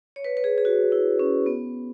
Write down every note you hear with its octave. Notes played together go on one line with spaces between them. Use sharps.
C#5
B4
B4
G#4
G#4
F#4
E4
C#4
B3